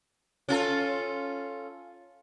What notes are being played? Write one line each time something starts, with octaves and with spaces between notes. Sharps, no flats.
C#4 F4 A4